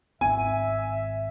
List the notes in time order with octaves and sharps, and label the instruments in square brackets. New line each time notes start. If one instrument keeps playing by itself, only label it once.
[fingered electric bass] G#1 C4 [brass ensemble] E5 [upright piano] G#5